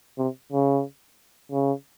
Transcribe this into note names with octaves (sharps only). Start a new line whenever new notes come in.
C3
C#3
C#3